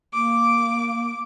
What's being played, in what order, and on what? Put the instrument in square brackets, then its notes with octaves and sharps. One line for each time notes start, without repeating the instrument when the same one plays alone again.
[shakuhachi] A#3 [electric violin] D6